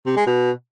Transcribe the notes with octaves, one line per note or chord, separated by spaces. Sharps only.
C3
G#3
B2